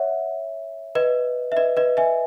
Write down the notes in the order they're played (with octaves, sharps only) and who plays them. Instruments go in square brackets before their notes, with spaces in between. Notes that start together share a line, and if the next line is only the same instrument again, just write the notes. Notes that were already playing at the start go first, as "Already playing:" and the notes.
Already playing: [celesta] C#5 E5 F#5
B4 D#5
E5
B4 D#5
B4 D#5
E5 G#5